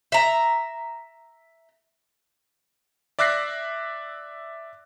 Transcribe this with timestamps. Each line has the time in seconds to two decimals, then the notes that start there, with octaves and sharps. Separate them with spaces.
0.12 E5 A#5
3.19 D5 E5 D6 F#6 A#6 C7